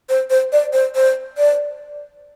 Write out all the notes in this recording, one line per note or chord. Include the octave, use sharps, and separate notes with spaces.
C5
C5
D5
C5
C5
D5